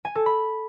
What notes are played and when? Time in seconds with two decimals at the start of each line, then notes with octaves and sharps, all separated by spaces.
0.05 G#5
0.15 A4
0.26 B5